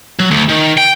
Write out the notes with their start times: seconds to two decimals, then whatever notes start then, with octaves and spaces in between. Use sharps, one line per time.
0.20 F#3
0.31 D2
0.49 D#3
0.78 G5